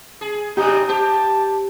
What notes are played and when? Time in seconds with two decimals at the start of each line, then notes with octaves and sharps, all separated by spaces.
0.21 G#4
0.57 G2 C3 F#3 D#4 G4 G#5
0.89 G4 C5 A5